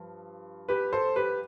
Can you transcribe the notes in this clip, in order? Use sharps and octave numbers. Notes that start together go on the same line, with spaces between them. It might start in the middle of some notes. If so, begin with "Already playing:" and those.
Already playing: G2 F3
G4 B4
A4 C5
G4 B4